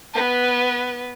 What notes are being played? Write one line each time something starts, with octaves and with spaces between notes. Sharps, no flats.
B3 B4